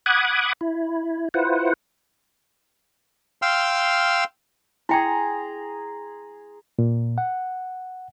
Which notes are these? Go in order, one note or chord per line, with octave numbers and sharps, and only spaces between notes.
F#5 B5 D6 D#6 F#6 G#6
E4
E4 F4 B4 C5 F#5
F5 G5 C6 E6 F6
E4 G#4 G5 A#5 C6
A#2
F#5